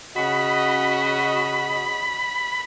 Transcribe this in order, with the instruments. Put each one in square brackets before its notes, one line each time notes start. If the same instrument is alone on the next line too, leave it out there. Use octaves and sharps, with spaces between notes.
[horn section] C#3 F#4 D#5 [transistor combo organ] B5